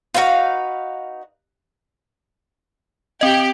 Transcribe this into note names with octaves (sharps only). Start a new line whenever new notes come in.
D#4 F4 F#4 B4 F5
C4 G4 D#5